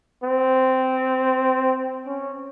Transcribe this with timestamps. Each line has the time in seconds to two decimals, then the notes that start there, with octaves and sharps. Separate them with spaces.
0.24 C4
2.07 C#4